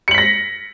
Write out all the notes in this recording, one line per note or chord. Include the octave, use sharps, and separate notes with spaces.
A#6 B6 C#7 F#7